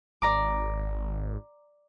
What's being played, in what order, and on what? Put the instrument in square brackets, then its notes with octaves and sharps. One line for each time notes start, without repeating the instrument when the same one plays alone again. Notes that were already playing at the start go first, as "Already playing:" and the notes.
[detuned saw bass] G#1 [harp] D5 A#5 D6